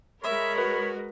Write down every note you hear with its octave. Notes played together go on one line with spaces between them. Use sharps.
G#3 A#4 C#5 E5 B5
F#4 B4